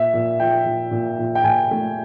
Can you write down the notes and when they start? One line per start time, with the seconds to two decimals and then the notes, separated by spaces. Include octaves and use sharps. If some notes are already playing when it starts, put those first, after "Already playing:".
Already playing: A#2 E5
0.14 A#2
0.39 F3 G5
0.66 A#2
0.91 A#2
1.19 A#2
1.35 G5
1.44 A#2 G#5
1.71 A3